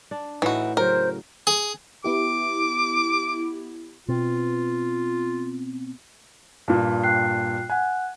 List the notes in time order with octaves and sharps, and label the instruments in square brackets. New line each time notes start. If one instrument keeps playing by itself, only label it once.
[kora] D4
[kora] A2 D#4 [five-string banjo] E3 F#4
[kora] C#3 F#3 G5 [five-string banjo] A#4 [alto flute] C5
[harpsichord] G#4
[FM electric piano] B3 E4 G4 [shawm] D6
[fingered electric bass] B2 C4 [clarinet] F4
[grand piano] G2 A#2
[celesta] G5 F#6 C7
[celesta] F#5 F#6 [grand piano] G#5